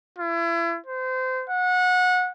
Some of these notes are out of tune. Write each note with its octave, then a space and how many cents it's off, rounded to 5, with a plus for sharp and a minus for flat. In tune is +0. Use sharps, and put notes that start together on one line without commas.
E4 +35
C5 -25
F#5 -25